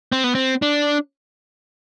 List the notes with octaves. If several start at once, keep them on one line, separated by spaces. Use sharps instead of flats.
C4
B3
C4
D4